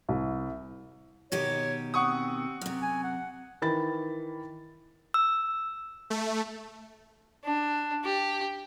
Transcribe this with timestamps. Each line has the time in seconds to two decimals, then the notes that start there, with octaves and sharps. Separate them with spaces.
0.09 C2
1.32 B2 D#3 G4 C#5
1.94 C4 F#5 C#6 D#6
2.61 F#2 C3
2.82 G#5
3.04 F#5
3.62 D#3 E3 B5 A6
5.14 E6
6.10 A3
7.44 D4
8.04 G4